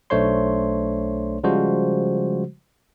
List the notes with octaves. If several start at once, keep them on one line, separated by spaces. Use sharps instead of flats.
B1 A3 D4 C5 C#5 C6
C#3 F3 G3 G#3 F#4 C5